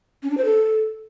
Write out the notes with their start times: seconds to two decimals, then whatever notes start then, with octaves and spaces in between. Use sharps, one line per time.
0.23 C#4
0.30 D4
0.38 C5
0.45 A4